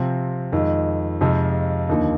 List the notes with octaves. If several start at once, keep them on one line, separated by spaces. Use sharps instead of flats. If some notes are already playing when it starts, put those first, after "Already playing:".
Already playing: C3 F3 C4
F2 D#3 G#3
F2 C3 F3 G#3 D#4
D#2 D3 F3 A#3 D#4